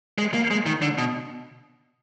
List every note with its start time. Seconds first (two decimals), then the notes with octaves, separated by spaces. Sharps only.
0.18 G#3
0.34 A#3
0.51 G#3
0.66 D#3
0.82 D3
0.98 B2